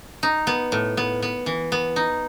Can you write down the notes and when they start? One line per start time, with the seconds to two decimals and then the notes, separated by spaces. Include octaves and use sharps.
0.23 D#4
0.47 B3
0.72 A2
0.97 B3
1.22 B3
1.46 E3
1.72 B3
1.96 D#4